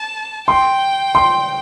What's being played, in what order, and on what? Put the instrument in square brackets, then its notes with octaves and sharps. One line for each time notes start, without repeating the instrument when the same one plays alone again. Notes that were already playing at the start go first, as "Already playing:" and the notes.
Already playing: [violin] A5
[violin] G5 [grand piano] C6
[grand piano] C6